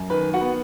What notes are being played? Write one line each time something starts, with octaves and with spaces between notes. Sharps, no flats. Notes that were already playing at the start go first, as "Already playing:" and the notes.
Already playing: F#2
D#3 B4
F#4 F#5
B3